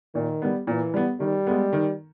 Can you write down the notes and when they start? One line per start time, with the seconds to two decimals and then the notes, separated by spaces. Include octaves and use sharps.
0.15 A#2 D#3
0.42 G3 B3
0.67 A#2 E3
0.94 G3 B3
1.20 D#3 G3
1.47 G#3 B3
1.73 D#3